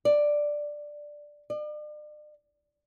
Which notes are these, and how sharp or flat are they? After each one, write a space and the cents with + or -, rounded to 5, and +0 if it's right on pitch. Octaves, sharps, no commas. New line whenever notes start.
D5 +5
D5 +40